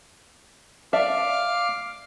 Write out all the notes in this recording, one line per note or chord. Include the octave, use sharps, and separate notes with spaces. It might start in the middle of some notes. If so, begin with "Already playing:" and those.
D5 E5 F5 A5 D6 F6